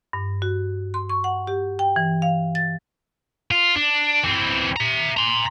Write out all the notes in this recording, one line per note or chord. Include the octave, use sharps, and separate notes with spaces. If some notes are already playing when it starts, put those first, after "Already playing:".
G2
F#4
C6
C#6
F#5
G4
G5
E3
F5
A6
F4
D4
E3 C4
E5 A#5
A#5 C6